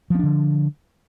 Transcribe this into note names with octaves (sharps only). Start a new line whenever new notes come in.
D3 F3 C4 D4